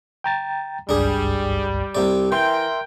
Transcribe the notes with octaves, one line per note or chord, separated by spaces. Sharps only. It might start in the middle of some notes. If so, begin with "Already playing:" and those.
G5 A#5 A6
G#1 C#2 G2 G3 D4 G#4
C2 C3 D5
E3 A#4 E5 G5 C6